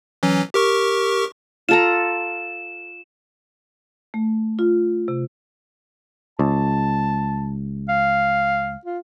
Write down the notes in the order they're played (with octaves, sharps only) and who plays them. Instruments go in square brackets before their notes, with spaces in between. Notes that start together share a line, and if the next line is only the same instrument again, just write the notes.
[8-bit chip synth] E3 F#3 C#4
G4 A#4 C#6
[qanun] F4 A4 A#5 [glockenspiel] E7
[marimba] A3
F4
C3
[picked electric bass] C#2 [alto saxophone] A5
[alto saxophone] F5
F4